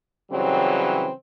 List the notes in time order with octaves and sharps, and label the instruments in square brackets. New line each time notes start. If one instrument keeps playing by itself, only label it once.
[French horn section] C#3 E3 F#3 G3 C4